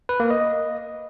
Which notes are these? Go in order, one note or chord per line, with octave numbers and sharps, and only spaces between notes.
B4
A#3
D#5